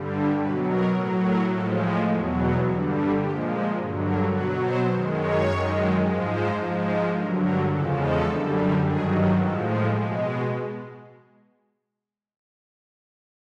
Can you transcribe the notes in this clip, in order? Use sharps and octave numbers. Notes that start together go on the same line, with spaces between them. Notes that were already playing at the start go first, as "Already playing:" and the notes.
Already playing: G2 D3 G3
B2 F#3 B4
A#4
A2 F#3
A#4
A2 F3 G#3 A4
E2 B2 F#3
G2 D3 G3 F#4
G4
A#2 F3 G#3 G4
G2 D3 F#3
A#4
B2 F#3 B4
C5
F#2 D#3 G#3
C#5
F#2 D#3 G#3
G#2 F3 G#3
C5
G#2 F3 G#3
C5
G2 D3 F#3 A#4
A#4
E2 C#3 F3 G#3 A4
A4
F#2 D3 G3
G2 D#3 F#3 G#4
A2 F3 G#3 A4
G#4
B2 G#3 G4